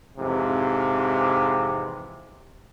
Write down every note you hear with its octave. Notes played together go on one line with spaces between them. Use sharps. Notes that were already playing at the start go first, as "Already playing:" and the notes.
F2 G#2 C3 E3